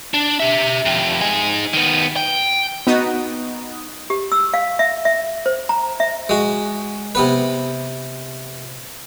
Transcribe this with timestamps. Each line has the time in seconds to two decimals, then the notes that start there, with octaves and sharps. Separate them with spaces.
0.14 D4
0.40 G4 E5
0.85 F2 G4
1.21 D#4 G#4
1.73 D#3 B3
2.16 G5
2.87 B3 D#4 F#4 D#6
4.10 G4
4.32 E6
4.54 F5
4.79 E5
5.05 E5
5.46 C5
5.69 A#5
6.00 E5
6.29 G#3 F#4
7.15 C3 B3 B4